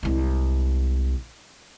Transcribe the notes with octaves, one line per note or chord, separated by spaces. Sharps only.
C2 G#3